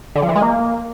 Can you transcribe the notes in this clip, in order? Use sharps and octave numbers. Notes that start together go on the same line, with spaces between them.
D3
F3
E3
G#3
A#3